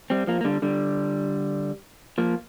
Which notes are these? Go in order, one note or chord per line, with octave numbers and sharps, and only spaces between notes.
G3 C4
F3 A#3
A#3
D3 G3
D3 G3
F3 A#3